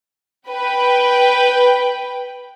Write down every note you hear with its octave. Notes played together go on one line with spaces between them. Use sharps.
B4 G5